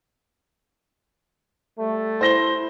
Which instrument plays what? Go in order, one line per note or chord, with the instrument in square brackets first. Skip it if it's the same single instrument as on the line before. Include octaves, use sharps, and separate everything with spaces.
[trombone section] G3 A3
[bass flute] E4 [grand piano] C5 A#6 G7